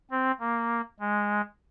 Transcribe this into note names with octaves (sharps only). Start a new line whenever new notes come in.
C4
A#3
G#3